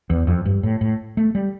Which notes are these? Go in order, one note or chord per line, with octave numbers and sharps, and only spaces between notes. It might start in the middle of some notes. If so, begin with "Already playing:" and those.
E2
F2
G2
A2
A2
A3
G3